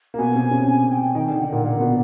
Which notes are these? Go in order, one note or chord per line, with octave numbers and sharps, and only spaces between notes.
A#3
B2 B3 G#5
C3 C4
C#3 C#4
G#5
G5
D#3 D#4 G5
D3 D4
D3 D4 F#5
A#2 A#3
A#2 A#3 F#5
B2 B3